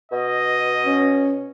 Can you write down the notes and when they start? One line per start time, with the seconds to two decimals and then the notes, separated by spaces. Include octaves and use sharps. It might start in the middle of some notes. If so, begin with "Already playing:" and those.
0.12 B2 D#5
0.86 C#4